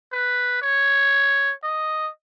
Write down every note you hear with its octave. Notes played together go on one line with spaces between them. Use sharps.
B4
C#5
D#5